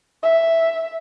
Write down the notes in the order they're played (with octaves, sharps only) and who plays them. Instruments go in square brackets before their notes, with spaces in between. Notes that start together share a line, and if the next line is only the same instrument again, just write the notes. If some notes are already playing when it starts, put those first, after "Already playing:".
[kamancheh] E5